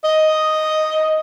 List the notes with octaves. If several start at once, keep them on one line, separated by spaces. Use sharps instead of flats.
D#5